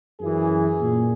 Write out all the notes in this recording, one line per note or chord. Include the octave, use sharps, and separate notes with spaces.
F#2 E3 G#4
A#2